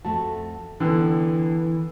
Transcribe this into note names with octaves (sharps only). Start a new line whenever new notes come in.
F2 A3 F#4 A5
D3 E3 B3 G5 E6